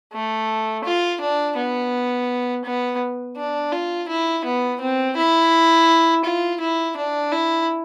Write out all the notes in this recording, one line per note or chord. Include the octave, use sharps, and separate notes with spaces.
A3
F4
D4
B3
B3
D4
F4
E4
B3
C4
E4
F4
E4
D4
E4